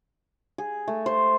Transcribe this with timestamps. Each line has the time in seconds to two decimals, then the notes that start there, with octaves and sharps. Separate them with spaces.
0.58 G#4
0.88 A3
1.06 C5